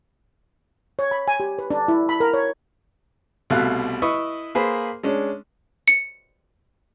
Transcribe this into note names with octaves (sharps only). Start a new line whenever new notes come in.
C#5
B5
G#5
G4
B4
D4
E4
B5
A#4
C#5
C2 B2 A3 F5 F#6
E4 B4 D#5 C#6
A#3 G#4 B4 C5
G#3 C#4 D4
C#7